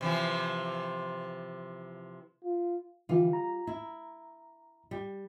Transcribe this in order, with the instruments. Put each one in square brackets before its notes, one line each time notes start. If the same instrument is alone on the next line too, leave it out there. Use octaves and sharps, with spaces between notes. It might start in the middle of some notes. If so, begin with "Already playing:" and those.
[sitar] C3 E3 F3
[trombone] F4
[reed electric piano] D3 E3 [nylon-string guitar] G3 F4
[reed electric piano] A#5
[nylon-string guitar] E4
G3